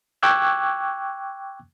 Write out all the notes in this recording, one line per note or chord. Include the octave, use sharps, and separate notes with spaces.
G5 C#6 D6 E6 F#6 G#6